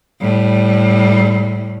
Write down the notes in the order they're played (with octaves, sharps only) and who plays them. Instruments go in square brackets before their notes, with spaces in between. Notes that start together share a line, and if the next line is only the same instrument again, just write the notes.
[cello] A2 G3